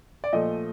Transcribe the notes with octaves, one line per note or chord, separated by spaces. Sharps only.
D5
A#2 F3 A3 D#5